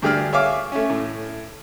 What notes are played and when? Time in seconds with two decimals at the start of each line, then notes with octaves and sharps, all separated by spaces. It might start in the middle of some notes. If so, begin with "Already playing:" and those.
0.02 D2 G2 G4 G#4 D5 F6
0.33 C#5 E5 F5 G#5 D6 F6
0.72 A3 C#4
0.90 A2